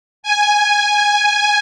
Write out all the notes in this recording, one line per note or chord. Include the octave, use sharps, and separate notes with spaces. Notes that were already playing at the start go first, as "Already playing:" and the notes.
G#5